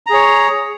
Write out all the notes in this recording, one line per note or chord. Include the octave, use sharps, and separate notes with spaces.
G#4 C#5 A#5